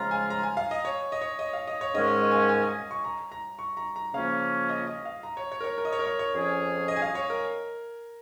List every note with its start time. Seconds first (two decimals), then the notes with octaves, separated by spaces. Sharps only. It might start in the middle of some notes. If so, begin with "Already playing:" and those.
Already playing: C#3 F3 G#3 F4 A#5
0.11 G#5
0.30 A#5
0.43 G#5
0.57 F5
0.71 D#5
0.85 C#5
1.12 D#5
1.21 C#5
1.39 D#5
1.53 F5
1.67 D#5
1.81 C#5
1.94 G#2 D#3 G#3 C#4 A#4 D#5
2.08 D#5
2.21 D#5
2.31 G#5
2.36 F5
2.49 G#5
2.63 D#5
2.91 C#6
3.04 A#5
3.32 A#5
3.59 C#6
3.77 A#5
3.96 A#5
4.14 C#3 F3 A#3 C#4 F5
4.69 D#5
4.87 D#5
5.05 F5
5.23 A#5
5.37 C#5
5.52 C#5
5.61 A#4
5.64 C#5
5.78 A#4
5.85 D#5
5.92 C#5
5.99 A#4
6.06 C#5
6.19 C#5
6.33 F2 F3 C#4 G#4
6.88 D#5
6.96 G#5
7.02 F5
7.15 C#5
7.30 A#4